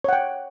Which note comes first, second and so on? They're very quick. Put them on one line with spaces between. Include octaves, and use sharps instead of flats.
C#5 F#5 G5